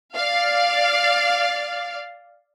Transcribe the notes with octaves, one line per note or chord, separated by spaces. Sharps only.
D5 F5